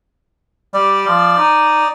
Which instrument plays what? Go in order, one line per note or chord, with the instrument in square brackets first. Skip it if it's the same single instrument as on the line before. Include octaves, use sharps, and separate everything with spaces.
[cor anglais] G3 [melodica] D5
[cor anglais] F3
D#4